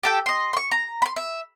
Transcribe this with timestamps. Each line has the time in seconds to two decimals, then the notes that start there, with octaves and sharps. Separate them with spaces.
0.03 G4 A4 G5
0.26 D#5 C6
0.53 C6 C#6
0.71 A#5
1.02 B5 C6
1.16 E5